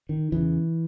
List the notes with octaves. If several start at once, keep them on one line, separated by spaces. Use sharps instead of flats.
D#3
E2 C#3 E3